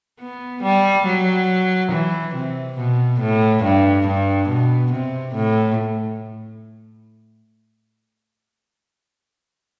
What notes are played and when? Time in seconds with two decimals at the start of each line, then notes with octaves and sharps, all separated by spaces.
0.20 B3
0.63 G3
1.06 F#3
1.92 E3
2.35 C3
2.78 B2
3.21 A2
3.63 G2
4.07 G2
4.49 B2
4.92 C3
5.35 A2